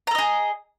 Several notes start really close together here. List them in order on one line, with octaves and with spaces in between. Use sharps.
A#5 A4 D#5 G#4